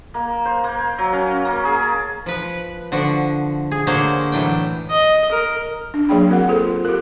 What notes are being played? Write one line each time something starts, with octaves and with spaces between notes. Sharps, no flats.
A#3
C5
A#3
F#3
C#4
A#3
G#4
A5
F3 B4
D3 F3 F#4
G#4
D3 A#3 F#4 C5 C#5
A2 E3 F#3 D4 G5
D#5
A#4
D4
F#3 A#3 G#4 D5 G5 B5
C4 F#4 A#4 F#5
F4 G#4 A4 C5
F4
G4 A#4